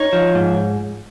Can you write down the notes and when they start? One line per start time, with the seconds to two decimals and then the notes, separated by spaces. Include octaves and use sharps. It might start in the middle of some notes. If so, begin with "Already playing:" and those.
Already playing: D#4 C#5
0.13 F3
0.35 G#2